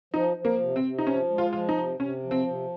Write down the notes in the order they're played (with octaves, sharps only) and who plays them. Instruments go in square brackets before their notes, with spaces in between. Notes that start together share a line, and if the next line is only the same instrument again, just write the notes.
[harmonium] F3 [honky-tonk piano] D#4
[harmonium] F3
[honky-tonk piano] A#3
[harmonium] C3
[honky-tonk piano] C4
[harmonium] C3
[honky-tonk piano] D#4
[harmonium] F3 [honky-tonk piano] C#4
[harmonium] G#3
[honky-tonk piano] F4
[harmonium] F3 [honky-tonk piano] F4
[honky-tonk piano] D#4
[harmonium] C3
[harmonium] C3 [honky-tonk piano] C#4
[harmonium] F3
[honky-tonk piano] C4
[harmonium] C3